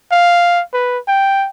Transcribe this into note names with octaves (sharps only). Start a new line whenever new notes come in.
F5
B4
G5